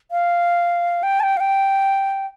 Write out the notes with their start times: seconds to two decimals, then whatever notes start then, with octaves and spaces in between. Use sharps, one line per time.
0.11 F5
1.03 G5
1.20 A5
1.23 G5
1.37 F5
1.40 G5